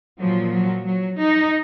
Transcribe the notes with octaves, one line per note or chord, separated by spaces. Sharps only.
A#2 F3 F#3
F#3
F#3
D#4